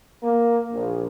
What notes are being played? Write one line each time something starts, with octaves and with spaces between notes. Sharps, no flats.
A#3
A#1